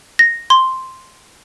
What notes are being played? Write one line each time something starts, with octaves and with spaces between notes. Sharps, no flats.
A#6
C6